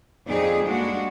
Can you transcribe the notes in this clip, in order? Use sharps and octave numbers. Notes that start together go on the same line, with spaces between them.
F2 C4 D#4 G#4 D5
G3 G#3 A#3 D4 F#4